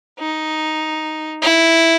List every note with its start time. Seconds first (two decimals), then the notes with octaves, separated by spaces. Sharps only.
0.20 D#4
1.42 E4